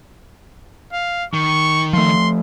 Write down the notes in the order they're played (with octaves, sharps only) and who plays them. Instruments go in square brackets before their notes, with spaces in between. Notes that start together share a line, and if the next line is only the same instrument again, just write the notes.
[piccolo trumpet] F5
[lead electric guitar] D#3 [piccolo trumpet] C#6
[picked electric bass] F3 A3 [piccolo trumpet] C6